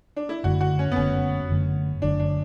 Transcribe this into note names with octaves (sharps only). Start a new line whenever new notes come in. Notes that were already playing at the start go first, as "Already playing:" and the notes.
D4
E4
F#1 F#2 D3 A3 F#4
F#4
C#4
B3
F#1 F#2 D3 A3 C#4
F#1 F#2 D3 A3
F#1 F#2 D3 A3 D4
D4